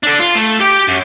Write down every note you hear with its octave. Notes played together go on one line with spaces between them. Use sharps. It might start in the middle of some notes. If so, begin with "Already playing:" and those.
D4 A4
F4
A3
G4 G5
F#2